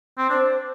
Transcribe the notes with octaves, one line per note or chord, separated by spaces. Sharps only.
C4
D4 C5